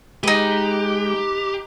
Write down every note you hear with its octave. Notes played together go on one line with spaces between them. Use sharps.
G#3 D#4 G4 B4